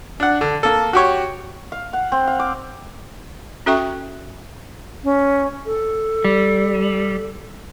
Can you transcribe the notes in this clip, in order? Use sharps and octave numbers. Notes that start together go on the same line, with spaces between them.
D4 F#5
D3
A#3 A4
F#4 G4 C#5
F5
F#5
C4
F5
D6
C#4 F#4 A4 E5 G5 C#6
C#4
A4
G3